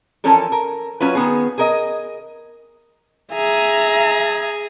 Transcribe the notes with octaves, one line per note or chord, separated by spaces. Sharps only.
E3 F3 C#4 A4 A#4
A#4
F#3 C#4 F4 B4
D#3 B3 G#4
G#4 A#4 D#5
G#4 E5 A#5